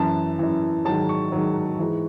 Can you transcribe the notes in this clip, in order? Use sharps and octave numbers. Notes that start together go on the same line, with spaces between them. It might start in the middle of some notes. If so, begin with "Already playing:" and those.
Already playing: F#2 E3 A5
F#2 E3
G#2 D#3 F#3 A5
C#6
G#2 D#3 F#3
G#2 E3